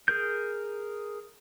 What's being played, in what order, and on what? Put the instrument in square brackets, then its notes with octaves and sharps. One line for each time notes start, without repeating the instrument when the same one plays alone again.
[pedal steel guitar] G#4 A#4 G6